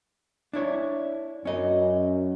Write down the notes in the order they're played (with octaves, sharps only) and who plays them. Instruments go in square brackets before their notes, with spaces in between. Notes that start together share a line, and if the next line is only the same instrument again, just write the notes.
[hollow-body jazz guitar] D4 E4 C#5
[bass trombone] F#2 [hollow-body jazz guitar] C#4 D#5